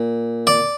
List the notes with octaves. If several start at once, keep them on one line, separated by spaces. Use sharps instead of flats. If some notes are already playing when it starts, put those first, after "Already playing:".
Already playing: A#2
D5